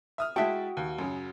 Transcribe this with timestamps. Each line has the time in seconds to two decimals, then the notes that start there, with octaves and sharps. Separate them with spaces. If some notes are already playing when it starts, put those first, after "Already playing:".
0.18 E5 D#6 F6
0.36 G#3 E4 F#4 E5 G5 A5
0.77 D#2
0.98 F#2 C#3